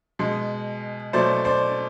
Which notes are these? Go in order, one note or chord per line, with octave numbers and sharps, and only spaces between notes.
B2 G#3
B2 F#3 A3 C5 D5
C5 D5